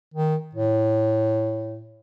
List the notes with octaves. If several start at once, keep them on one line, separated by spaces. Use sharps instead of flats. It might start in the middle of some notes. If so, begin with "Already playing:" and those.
D#3
A2